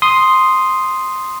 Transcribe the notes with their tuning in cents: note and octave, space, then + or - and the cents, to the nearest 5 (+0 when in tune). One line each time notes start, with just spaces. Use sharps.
C6 +0 D#6 +0